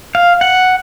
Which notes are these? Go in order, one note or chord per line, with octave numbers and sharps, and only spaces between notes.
F5
F#5